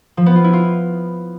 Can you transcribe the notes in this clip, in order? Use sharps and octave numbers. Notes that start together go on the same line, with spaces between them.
F3
B3
F4
E4
F4